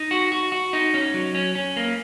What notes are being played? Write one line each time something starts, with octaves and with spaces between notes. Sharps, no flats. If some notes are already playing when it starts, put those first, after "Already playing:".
Already playing: D#4
F#4
F#4
F#4
D#4
C#4
F#3
C#4
C#4
A#3